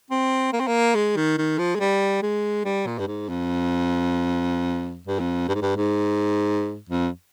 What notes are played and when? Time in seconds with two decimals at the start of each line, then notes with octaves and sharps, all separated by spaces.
0.10 C4
0.53 A#3
0.60 C4
0.67 A#3
0.95 G#3
1.16 D#3
1.38 D#3
1.59 F3
1.75 G#3
1.80 G3
2.22 G#3
2.65 G3
2.86 A#2
2.99 G2
3.07 G#2
3.29 F2
5.07 G2
5.20 F2
5.48 G2
5.55 G#2
5.62 G2
5.76 G#2
6.89 F2